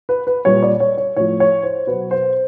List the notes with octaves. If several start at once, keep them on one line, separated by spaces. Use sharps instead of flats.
B4
B4
A#2 G3 C#5
D5
C#5
C#5
A2 F3 C#5
C#5
C5
B2 F#3 B4
C5